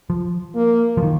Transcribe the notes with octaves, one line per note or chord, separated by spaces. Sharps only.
F3
A#3
F3
D#3